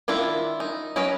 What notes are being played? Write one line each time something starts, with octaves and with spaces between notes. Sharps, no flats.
D#3 D4 E4 F4
D#4
F#3 C#4 A#4 B4 D#5